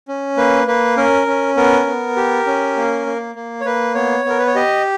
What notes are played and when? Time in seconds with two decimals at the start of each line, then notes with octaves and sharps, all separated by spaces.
0.08 C#4
0.37 A#3 B4
0.67 A#3 B4
0.97 C#4 A#4
1.27 C#4
1.57 B3 A#4
1.87 B3
2.16 G4
2.46 C#4
2.77 A#3
3.06 A#3
3.35 A#3
3.60 C#5
3.65 A#3 B4
3.95 B3 C#5
4.25 B3 A#4
4.39 B4
4.47 C#5
4.55 G4 D#5